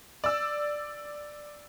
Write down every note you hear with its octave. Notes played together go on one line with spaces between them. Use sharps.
D5 E6